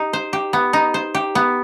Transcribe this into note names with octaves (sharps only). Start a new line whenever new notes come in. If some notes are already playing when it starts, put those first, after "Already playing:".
Already playing: D#4 G4
C5
G4
B3
D#4
C5
G4
B3